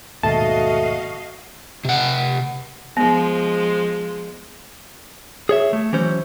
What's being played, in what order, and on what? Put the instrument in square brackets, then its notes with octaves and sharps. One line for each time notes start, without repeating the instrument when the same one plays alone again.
[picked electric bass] D#2 G#2 B2 [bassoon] A3 [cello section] F#4 D#5 F5 [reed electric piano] A5
[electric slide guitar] C3 F#5
[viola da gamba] F3 G#3 [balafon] B3
[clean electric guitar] G#4 C#5 E5
A3
E3 F#3 C#4 C5